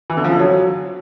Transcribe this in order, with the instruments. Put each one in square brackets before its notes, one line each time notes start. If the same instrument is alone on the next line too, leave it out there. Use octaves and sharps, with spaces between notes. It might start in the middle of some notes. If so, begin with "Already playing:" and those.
[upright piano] E3
D3
F3
D3
F#3